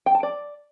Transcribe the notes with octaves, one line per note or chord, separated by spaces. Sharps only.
G5
A5
D5